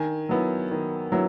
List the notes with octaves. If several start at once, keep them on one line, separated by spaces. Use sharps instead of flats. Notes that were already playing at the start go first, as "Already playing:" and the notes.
Already playing: D#3 G#5
F#3 B3 E4
D#3
F#3 B3 E4